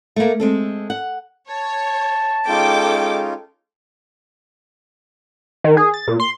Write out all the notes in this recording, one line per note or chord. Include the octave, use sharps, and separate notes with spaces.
A3 A#3
G#3 C4 A4
F#5
C#5 A5
G#3 C#4 D#4 F4 A4 G5 D6
D#3
G#4
A6
A#2
C6